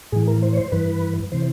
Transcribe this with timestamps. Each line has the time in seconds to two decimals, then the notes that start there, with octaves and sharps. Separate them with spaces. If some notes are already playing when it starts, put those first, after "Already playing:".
0.12 A2 E3 G#4
0.27 A#4
0.42 C5
0.53 C#5
0.57 C5
0.72 G2 E3 B4
1.32 C3 E3 C5